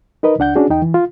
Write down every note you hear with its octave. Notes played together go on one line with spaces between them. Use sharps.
D#4 A#4 B4 D#5
C#2 D4 F#5 G6
C#4 D4 F#4 G#4
E2 D#4 G5
E3
F4